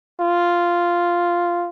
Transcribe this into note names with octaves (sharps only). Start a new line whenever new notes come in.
F4